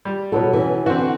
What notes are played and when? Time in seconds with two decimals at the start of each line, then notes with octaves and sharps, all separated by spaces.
0.05 G3
0.32 B2 F#3 A4 C5 C#5
0.53 E3 C#4
0.86 D3 E3 C4 F#4